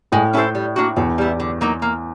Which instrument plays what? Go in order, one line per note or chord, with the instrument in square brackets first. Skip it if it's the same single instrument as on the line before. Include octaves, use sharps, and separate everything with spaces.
[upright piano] A2 [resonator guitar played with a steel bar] G#3
[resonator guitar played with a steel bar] C#4 E4 A4 C5
G3
A#3 D4 F#4
[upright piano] E2 [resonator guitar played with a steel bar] B2
[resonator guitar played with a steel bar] G3 B3 E4
D3
F#3 A#3 D#4
A#3